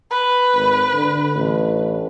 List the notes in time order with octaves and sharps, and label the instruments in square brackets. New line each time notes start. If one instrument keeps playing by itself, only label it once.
[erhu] B4
[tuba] G#1
D3
A1